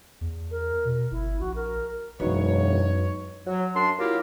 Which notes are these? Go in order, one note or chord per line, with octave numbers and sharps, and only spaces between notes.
E2
A#4
B2
G1 E4
A#1 F#4
A#4
E1 F#2 D#4 F#4 B4 C#5
F#3
F#2 D4 C6
F#3 A#3 E4 F4 G4 A#4